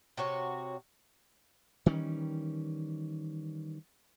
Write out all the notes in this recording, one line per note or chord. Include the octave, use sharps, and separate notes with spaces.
C3 F#4 C#5
D#3 E3 G3 C#4